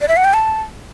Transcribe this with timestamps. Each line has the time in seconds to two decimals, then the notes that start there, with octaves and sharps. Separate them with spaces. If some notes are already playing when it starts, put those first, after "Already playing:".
0.01 D5
0.08 E5
0.17 F#5
0.25 G5
0.34 A5